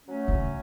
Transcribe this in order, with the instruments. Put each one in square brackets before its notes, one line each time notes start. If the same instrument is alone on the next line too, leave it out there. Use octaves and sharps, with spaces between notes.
[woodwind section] F#3 A3 C#4
[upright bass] C#3